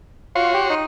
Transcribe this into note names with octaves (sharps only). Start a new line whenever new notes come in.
F4 F#4 C#5 C6
G4
D#4